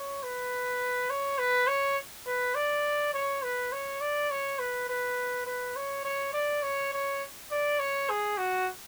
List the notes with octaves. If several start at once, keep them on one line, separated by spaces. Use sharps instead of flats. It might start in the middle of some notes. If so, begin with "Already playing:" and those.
Already playing: C#5
B4
C#5
B4
C#5
B4
D5
C#5
B4
C#5
D5
C#5
B4
B4
B4
C#5
C#5
D5
C#5
C#5
D5
C#5
G#4
F#4